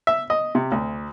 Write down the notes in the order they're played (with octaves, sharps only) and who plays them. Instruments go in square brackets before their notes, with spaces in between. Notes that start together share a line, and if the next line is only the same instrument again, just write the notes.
[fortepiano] E5
D#5
C3
D2